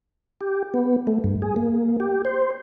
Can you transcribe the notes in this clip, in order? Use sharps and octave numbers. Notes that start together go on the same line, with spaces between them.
G4
B3
A3
G2
G#4
A#3
G4
C5